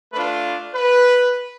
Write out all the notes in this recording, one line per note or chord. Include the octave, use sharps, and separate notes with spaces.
A3 D4 F4 B4
B4